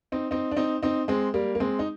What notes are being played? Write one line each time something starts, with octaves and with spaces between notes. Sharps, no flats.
C4 D#4
C4 D#4
D4
C4 D#4
C4 D#4
G#3 C4
G3 A#3
A#3
G#3 C4
D#4